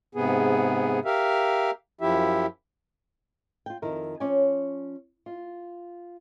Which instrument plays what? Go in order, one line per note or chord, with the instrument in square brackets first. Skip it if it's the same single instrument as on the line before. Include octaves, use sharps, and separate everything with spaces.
[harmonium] G#2 C3 B3 G#4
G4 A#4 E5 F5
F#2 F3 E4 G4 E5
[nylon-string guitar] F4 G5
F2 D#3 E4 A#4
F3 C#4 C#5 D5 G#5
F4